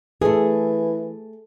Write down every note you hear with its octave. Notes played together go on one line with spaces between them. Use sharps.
E3 A3 G#4 A4